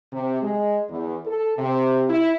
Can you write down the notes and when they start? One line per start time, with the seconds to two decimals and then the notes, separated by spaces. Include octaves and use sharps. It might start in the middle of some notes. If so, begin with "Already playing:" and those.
0.12 C3
0.42 G#3
0.89 E2
1.26 A4
1.58 C3
2.08 E4